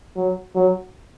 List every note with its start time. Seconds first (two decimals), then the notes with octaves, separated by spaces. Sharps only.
0.16 F#3
0.55 F#3